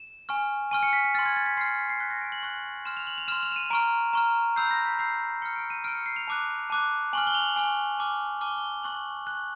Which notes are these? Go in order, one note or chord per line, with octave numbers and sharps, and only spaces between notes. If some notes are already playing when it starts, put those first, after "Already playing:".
Already playing: E7
G#5 C#6 F6
G#5 C#6 F6 D#7
C#7
B6
B6
C6 F6 A6
G#6
A6
B6
C6 F6 C7
C7
B6
C7
C#6 F#6 B6
A#6
D7
F#7
C#6 F#6
C6 F6 E7
F7
F#7
F7
C6 F6 E7
F7
E7
D#7
A#5 C#6 F6 D7
A#5 C#6 F6
B5 E6 G6 C7
A#6
B6
B5 E6 G6 C7
C#6 F6 C#7
D7
D#7
C#6 F6 D7
C#7
C7
F7
A5 D6 F#6
A5 D6 F#6
G#5 C#6 F6 F#7
G7
F7
F#7
G#5 C#6 F6
A5 D6 F6
A5 D6 F6 G7
G7
C#6 F#6 F#7
C#6 F#6